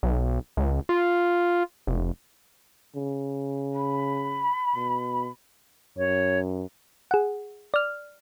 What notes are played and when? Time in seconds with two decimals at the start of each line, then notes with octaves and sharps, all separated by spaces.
0.03 B1
0.57 C#2
0.89 F4
1.87 F1
2.96 C#3
3.74 B5
4.75 B2
5.97 F#2 C#5
7.11 G#4 F#5
7.74 D5 F6